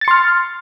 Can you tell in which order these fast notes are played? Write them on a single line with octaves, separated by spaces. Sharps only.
A6 C#7 C6 F6